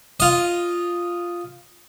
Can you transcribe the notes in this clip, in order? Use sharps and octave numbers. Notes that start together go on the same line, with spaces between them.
F4 D#5